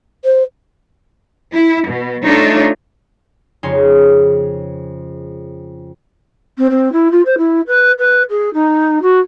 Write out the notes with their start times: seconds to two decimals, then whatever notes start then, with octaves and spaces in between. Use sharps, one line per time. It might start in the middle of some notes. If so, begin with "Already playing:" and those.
0.25 C5
1.53 E4
1.87 B2
2.24 A3 D4 D#4 F4 C#5
3.63 F2 C#3 G#3 D#4 C#5 C6
6.57 C4
6.70 C4
6.92 E4
7.11 F4
7.25 C5
7.38 E4
7.67 B4
7.98 B4
8.30 G#4
8.53 D#4
9.02 F#4